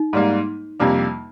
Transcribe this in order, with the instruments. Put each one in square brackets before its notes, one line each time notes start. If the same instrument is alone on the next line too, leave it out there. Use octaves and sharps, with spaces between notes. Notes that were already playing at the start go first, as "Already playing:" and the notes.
Already playing: [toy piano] D#4
[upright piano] G#2 G3 A#3
F2 C3 G3 A#3 D4